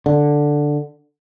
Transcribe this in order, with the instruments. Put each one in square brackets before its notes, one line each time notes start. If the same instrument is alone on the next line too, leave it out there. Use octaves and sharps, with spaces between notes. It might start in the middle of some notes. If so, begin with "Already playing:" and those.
[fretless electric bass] D3